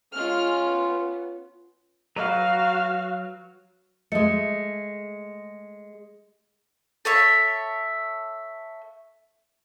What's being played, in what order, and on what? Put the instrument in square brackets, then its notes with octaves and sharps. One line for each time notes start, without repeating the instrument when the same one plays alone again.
[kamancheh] G#3 F6 [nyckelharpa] C#4 F4
[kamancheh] B3
[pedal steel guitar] F#3 B4 A#5 [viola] F#4 F5
[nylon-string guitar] G#3 A3 [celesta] D#5 C#7
[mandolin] A4 C#5 E5